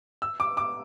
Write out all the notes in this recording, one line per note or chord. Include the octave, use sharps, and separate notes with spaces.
E6
D6
D6